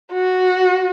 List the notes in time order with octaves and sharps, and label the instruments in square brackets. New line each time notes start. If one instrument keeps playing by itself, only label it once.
[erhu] F#4